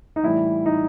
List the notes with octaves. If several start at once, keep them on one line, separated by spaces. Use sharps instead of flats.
D#4
A2 E3 G3 E4
D#4